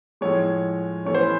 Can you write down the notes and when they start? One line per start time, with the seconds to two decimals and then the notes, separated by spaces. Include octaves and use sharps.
0.21 A2 F3 G#3 C#5
1.05 E3 A3 C#4 C#5
1.15 C5
1.23 B4